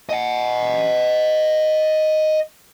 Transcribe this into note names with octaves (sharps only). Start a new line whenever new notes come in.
D#5 F#5